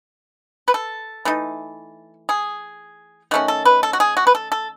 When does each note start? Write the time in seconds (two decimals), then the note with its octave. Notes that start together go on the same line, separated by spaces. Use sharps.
0.68 B4
0.74 A4
1.25 E3 A3 D#4
2.29 G#4
3.31 D#3 A3 C#4 F#4
3.48 A4
3.65 B4
3.83 A4
3.93 F#4
4.00 G#4
4.17 F#4
4.27 B4
4.35 A4
4.52 A4